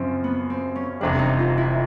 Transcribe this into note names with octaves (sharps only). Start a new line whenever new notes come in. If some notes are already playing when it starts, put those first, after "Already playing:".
Already playing: F#2 C#3 F3 C4
B3
C4
C#4
F1 F2 C3 E3 G3 D4
D#4
F4
E4